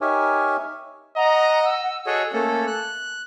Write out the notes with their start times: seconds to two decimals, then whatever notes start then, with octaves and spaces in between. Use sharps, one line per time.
0.01 D#4 G4 A#4 C#5 E5 G#5
1.17 D#5 F#5 A#5
1.65 E6
2.06 F#4 G#4 A4 C#5 D#5
2.33 A3 A#3 C#4 A4
2.67 F#6